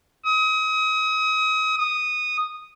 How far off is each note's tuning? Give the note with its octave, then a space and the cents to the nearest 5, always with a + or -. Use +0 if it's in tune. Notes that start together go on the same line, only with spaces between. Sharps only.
D#6 +35
D#6 -10